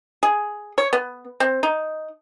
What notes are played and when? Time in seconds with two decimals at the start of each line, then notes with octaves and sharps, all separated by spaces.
0.23 G#4
0.78 C#5
0.93 B3
1.40 C4
1.63 D#4